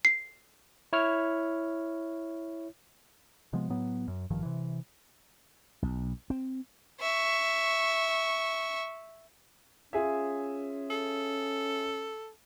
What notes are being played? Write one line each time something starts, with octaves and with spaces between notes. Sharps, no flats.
C7
E4 C#5 F6
C3 F3 G#3 B3
A2 F#3 B3
F#2
G#1 G2 D#3 F3
C3 E3
B1
C4
E5 C#6
C#4 F4 G#4 E5
A4